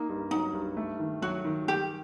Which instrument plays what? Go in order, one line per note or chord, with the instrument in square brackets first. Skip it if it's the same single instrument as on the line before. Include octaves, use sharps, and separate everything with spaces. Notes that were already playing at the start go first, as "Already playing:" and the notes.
Already playing: [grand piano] A#3 [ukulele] D#4
[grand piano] G2
[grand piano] F#3 [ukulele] D#4
[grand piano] G2
A3
D#3
[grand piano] F#3 [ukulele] F#4
[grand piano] D#3
[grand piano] G3 [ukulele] G4